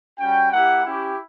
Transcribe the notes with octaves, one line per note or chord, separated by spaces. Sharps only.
G3 C#4 F#4 G5
A#3 E4 G4 F#5
C#4 E4 G4